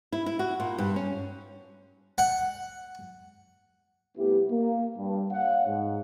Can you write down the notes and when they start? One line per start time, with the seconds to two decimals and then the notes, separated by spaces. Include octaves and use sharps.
0.12 E4
0.26 E4
0.39 F#4
0.60 A#2
0.78 G2
0.96 C#4
2.18 F#5
4.17 C2 A3 B3 E4 G4
4.50 A#3
4.97 G2
5.31 C#5 F5 F#5
5.67 G#2